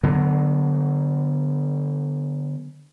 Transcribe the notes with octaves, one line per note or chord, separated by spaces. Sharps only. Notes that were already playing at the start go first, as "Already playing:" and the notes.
D3 F#3 B3